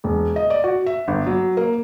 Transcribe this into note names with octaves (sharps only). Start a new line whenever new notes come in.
E1
D#5
D5
F#4
E5
G1
F#3
A#3